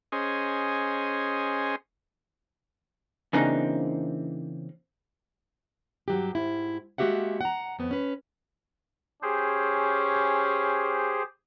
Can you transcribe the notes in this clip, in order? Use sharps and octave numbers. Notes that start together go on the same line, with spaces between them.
C#4 G#4 C5 D#5
C#3 E3 A#3 C4 D4 D#4
G2 F#3 G4
G#2 E4
G#3 A#3 F#4 G4 E5 F#5
F#5 A#5
F2 B3
C#4 B4
C#4 G4 G#4 C5